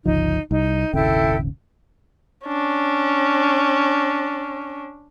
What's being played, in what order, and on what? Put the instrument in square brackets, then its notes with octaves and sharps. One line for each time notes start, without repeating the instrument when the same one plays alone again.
[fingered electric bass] G1 C#2 F3 [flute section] D#4
[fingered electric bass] C2 [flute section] D#4
[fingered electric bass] D#1 G#1 C#3 [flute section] E4 A4 G5
[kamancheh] C#4 D4